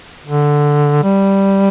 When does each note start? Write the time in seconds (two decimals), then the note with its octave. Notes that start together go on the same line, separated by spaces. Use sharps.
0.25 D3
1.03 G3